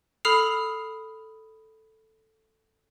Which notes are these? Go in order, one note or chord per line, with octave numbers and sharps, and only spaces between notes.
A4 B5 D#6 F6 C7 F7